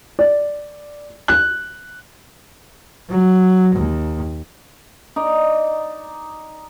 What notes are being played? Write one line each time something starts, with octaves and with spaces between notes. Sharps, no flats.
D5
F#6
F#3
D#2
D#4 D5